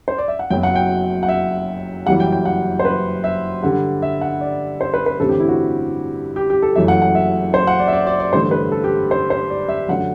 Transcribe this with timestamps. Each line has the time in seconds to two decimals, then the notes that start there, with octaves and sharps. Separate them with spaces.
0.08 C5
0.18 D5
0.28 E5
0.39 F#5
0.50 F#1 F#2 F#3 B3 G5
0.63 F#5
0.75 G5
1.23 F#5
1.29 E5
2.06 F#1 F#2 E3 G3 F#5
2.20 G5
2.32 G5
2.45 F#5
2.79 C5
2.85 B4
3.24 E5
3.63 G2 D3 G3 F#5
4.02 E5
4.21 F#5
4.41 D5
4.81 C5
4.94 B4
5.06 B4
5.19 A1 G2 D3 G3 C4 A4
5.29 G4
5.40 E4
5.49 F#4
6.36 G4
6.50 G4
6.62 A4
6.76 F#1 F#2 E3 A3 E5
6.88 F#5
7.02 F#5
7.15 E5
7.54 C5
7.67 F#5
7.80 D5
7.88 E5
7.93 D5
8.07 D5
8.20 D5
8.33 A1 G2 D3 A3 C5
8.51 B4
8.72 A4
8.84 G4
9.11 C5
9.30 C5
9.50 D5
9.69 E5
9.89 F#2 D3 A3 F#5